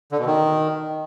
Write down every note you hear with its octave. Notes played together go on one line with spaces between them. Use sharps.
D3
B2
D#3